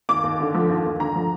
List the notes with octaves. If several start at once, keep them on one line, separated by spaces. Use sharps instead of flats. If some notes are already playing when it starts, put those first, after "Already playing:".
D#2 D6
D#2
D3
F3
D#2
D#2
D3 A#5
F3